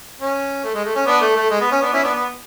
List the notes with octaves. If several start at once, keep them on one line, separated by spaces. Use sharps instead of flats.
C#4
A3
G#3
A3
C#4
B3 D4
A3
A3
G#3
B3
C#4
B3 D4
C#4 E4
B3 D4
B3